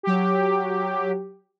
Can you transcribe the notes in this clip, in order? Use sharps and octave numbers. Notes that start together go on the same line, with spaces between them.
F#3 G4